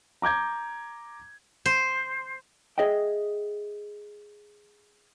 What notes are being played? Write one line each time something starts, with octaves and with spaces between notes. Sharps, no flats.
A#5 D6 G6 G#6
C5
G#4 D#5 E5 G5